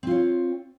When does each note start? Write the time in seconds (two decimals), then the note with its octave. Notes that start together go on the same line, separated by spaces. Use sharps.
0.03 C4
0.07 F4
0.11 C#5